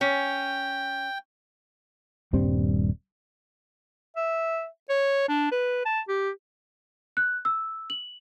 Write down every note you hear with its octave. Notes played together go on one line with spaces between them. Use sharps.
C#4 G5
D#1 G2 G3 C4
E5
C#5
D4
B4
A5
G4
F#6
E6
F#7